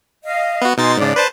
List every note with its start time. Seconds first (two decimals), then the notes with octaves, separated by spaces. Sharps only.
0.23 D#5 F5
0.62 B3 F#4
0.78 B2 D#4 G#4 C6 A6
0.97 G#2 C#3 D4 D5
1.16 B4 C5 A5